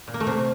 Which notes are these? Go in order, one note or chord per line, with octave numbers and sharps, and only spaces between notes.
A#2
A#3
A3
C3